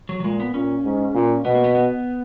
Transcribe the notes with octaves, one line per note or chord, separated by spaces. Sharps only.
F#3
F#3
A#2 G#3
B3
A#2 C#4
G#2
A#2
B2 B3
A#3
B3
B3